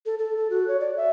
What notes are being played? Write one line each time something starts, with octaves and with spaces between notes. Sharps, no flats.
A4
A4
A4
F#4
C#5
D5
E5